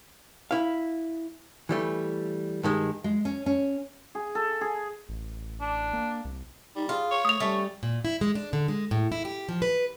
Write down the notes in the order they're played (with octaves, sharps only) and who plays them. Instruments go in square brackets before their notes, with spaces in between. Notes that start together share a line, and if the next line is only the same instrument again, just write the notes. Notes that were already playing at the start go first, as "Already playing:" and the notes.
[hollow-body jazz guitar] E4 F5
E3 G3 A3
G2 D#3 G#3
[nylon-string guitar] G#3
C#4
C#4
[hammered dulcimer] G#4
A4
G#4
[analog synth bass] A1
[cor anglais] D4
[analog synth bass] A#3
C2
[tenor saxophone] G3 [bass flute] D#4
[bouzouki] F4 [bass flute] G#4
[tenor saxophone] C#5
[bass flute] A3 [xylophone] D#6 F7
[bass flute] G3 [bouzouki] A3 C#4
[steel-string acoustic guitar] A#2
E4
G#3
D4
D3
G#3
A2
E4
G4
F3
B4